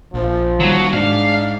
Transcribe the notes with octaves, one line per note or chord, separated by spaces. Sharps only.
A#1 F3
D#3 F#3 G3
G#2 D4 F5